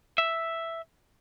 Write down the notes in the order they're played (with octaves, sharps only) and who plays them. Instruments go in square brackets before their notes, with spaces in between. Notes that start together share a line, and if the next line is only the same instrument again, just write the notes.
[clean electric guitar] E5